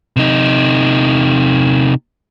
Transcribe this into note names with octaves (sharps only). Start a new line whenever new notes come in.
C3 D#4